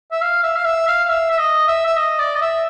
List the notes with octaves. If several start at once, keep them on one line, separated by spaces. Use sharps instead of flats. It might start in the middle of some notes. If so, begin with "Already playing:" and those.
E5
F5
E5
F5
E5
F5
F5
E5
E5
D#5
E5
E5
D#5
D5
D#5
E5